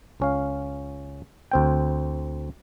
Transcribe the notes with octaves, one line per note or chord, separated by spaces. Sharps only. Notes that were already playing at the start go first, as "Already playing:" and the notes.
C#2 C#4 F5
D2 C4 G5